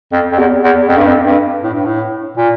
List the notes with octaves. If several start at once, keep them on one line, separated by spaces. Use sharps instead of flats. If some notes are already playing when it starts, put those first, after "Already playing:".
F2
F2
E2
E2
F2
G2
F2
G2
A2
G2
A2
A#2